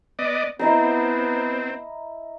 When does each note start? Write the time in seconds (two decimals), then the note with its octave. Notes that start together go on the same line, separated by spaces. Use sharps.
0.19 B3 D5 D#5
0.59 B3 C4 E4 D#5 A#5